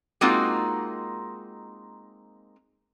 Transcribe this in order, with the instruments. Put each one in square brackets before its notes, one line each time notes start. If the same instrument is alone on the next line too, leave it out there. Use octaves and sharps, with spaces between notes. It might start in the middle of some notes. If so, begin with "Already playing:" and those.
[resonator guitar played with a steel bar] G#3 A#3 C4 D#4 F4 F#4